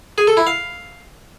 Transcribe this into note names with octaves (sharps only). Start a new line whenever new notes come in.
G#4
A4
E4
F5